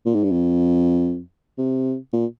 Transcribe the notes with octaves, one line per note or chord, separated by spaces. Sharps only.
A#2
G#2
G2
F2
C3
A#2